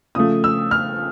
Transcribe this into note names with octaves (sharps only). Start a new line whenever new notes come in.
C#3 F3 A3 D#6
E6
F6